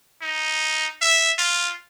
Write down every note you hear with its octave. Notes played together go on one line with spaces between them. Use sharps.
D#4
E5
F4